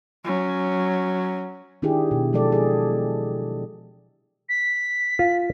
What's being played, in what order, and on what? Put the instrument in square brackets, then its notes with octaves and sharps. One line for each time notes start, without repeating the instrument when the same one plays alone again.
[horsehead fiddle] F#3 C#4
[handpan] D#3 D4 E4 G4 G#4
B2
F3 F#3 G#3 A4 D5
G#4
[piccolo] B6
[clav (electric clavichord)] F4